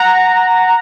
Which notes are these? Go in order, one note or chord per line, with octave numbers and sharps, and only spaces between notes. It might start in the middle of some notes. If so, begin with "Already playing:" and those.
Already playing: F#5 A#5